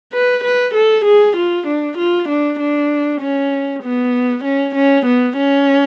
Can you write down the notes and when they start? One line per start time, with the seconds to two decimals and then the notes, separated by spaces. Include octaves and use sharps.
0.13 B4
0.44 B4
0.74 A4
1.05 G#4
1.36 F4
1.67 D4
1.98 F4
2.29 D4
2.59 D4
3.21 C#4
3.83 B3
4.44 C#4
4.75 C#4
5.06 B3
5.37 C#4